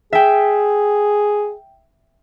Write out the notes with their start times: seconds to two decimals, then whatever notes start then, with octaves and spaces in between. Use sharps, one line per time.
0.13 G#4 E5 G5